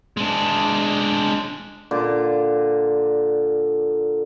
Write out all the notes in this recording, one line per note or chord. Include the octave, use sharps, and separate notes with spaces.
G#3 D4
A#2 D3 D6